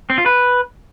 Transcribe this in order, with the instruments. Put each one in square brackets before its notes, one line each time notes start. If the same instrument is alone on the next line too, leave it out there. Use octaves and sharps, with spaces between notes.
[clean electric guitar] C4
F4
B4